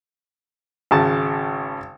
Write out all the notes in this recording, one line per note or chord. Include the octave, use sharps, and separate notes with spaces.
G#1 C#3 A5